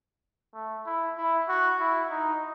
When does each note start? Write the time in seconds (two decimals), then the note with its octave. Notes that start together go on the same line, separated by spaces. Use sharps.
0.54 A3
0.86 E4
1.18 E4
1.49 F#4
1.80 E4
2.10 D#4